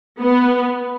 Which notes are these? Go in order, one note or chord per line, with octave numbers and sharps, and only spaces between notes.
B3